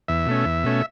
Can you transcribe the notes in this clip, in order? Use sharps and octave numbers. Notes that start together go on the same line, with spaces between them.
E2 E5
B2 A3 C#4
E2
B2 A3 C#4